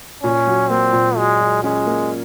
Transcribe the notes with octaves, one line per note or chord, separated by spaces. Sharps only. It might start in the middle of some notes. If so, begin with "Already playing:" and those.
A#2 C#4
F#3
A#3 C4
A#2
F#3 G#3
F#3
G#3 C#4
A#3